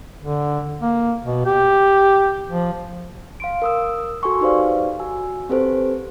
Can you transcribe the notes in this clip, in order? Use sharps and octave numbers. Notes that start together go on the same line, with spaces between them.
D3
A#3
B2
G4
F3
F5 C6 D7
A#4 D#6 E6
F#4 A4 G#5 C6 C#6 E6
D#4 G4 B4 C5 D5 F5
F#4 G#5 E6
C4 G4 A4 B4 C5